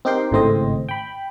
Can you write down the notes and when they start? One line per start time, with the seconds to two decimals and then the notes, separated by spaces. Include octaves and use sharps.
0.05 C4 D#4 G4 A#4 G5 C6
0.31 G#1 A2 C#3 C4 C5 D#5
0.89 G5 B5